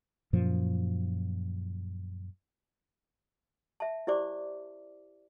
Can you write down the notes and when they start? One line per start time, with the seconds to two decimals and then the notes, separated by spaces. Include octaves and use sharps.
0.33 F#2 A#2 F3
3.80 E5 A5
4.07 E4 G4 C5 D5 D6